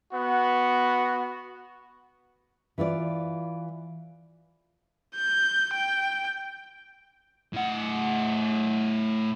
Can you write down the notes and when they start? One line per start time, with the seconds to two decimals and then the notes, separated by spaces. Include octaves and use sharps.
0.13 B3 F#4
2.78 E3 E4 F4 D5
5.15 G6
5.74 G5
7.53 A2 F#5